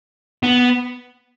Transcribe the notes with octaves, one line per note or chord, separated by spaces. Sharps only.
B3